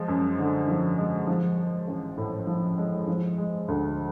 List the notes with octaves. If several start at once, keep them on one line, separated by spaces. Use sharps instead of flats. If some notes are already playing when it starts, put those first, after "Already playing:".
Already playing: F3 G#3
F#2
D3
F3
G#3
F3
G#3
A1
A2
F3
G#3
F3
G#3
D2